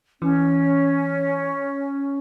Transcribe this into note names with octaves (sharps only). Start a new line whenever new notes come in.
E3 C#4